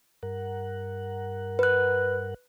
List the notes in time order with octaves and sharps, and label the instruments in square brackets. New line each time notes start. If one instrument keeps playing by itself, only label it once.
[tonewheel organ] G2 A#4 F#5
[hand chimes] B4 F#6